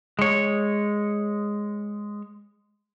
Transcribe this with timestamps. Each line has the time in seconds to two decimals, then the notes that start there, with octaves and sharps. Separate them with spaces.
0.19 G#3 C#5